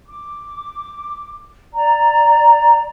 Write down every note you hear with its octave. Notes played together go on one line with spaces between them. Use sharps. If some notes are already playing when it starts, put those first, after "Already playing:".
D6
D5 A#5